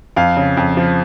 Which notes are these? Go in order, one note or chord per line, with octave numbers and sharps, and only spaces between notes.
F2 F5
C#3
F2
F3